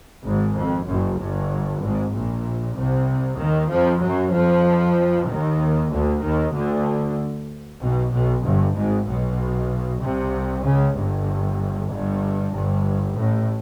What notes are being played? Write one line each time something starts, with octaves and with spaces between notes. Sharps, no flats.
G#1 G#2
F2
F#1 F#2
G1 G2
G#1 G#2
A#1 A#2
C2 C3
D#2 D#3
F2 F3
F#2 F#3
F2 F3
D#2 D#3
D2 D3
D#2 D#3
D2 D3
B1 B2
B1 B2
G1 G2
G#1 G#2
B1 B2
C2 C3
C#2 C#3
G1 G2
G1 G2
G1 G2
A1 A2